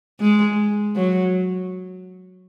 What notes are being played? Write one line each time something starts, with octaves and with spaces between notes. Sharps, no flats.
G#3
F#3